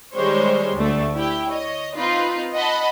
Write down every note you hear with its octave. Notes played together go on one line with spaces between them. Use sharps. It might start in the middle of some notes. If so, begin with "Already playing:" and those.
D#3 G3 G#3 C5 C#5
D2 A3 D5
E4 G4 G5
C#5 D#5
C4 D#4 F4 B4
D#5 F#5 A5 B5